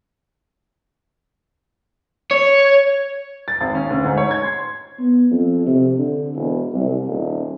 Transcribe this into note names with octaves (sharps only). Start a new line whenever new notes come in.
C#5
A6
G#1
C#4
D2
G#2
C#5
G#6
C6
B3
F2
C3
D3
E1
C2
D#1